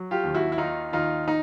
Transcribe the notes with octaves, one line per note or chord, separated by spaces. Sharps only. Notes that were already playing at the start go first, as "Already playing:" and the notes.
Already playing: F#3
F4 G4
D#2
E4 F#4
E4
D#3 D#4 F4
D#2 D#4 F4
D#4